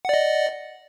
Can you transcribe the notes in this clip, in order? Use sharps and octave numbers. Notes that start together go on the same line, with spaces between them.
D5 D#5 F#5